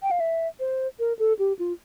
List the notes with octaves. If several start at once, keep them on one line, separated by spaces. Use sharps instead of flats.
G5
F5
E5
C5
A#4
A4
G4
F4